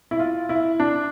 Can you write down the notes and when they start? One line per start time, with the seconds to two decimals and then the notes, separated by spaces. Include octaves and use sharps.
0.11 E4
0.19 F4
0.49 E4
0.80 D4